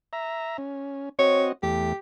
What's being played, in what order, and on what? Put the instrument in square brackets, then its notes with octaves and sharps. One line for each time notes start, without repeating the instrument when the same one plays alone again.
[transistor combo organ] E5 A#5
C#4
[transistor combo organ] C4 F#4 D#5 [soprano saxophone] C#5
[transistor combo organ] E2 A3 [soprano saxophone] G4